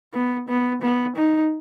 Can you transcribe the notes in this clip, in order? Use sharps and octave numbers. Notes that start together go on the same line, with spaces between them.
B3
B3
B3
D#4